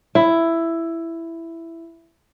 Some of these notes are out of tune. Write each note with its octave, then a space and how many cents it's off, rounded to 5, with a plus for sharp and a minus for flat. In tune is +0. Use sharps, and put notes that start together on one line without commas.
E4 +10